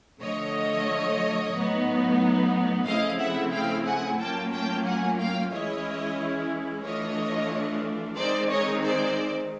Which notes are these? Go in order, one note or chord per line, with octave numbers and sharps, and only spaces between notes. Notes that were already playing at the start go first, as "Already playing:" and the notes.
D3 F3 A3 C#5 D#5
A2 F#3 B3 D#4
C#3 F3 A3 C4 E4 D#5 F5
E5 F#5
F5 G5
F#5 G#5
A2 F#3 A#3 C#4 F4 G5 A5
G5 A5
F#5 G#5
F5 G5
E3 G#3 C#4 E4 C#5 D#5
E3 A3 D4 F4 C#5 D#5
D#3 G#3 C4 D#4 C5 D5
C#5 D#5
C5 D5